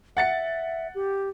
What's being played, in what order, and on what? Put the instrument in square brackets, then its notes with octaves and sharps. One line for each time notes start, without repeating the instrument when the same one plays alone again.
[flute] E5 [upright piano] F#5 A6 C#7
[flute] G4